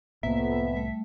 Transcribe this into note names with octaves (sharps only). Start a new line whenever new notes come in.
C2 F2 A2 A#3 B3 E5
G3 A3